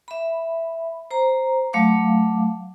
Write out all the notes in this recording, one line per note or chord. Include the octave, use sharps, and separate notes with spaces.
E5 B5
C5 A#5
F#3 A3 F5 D6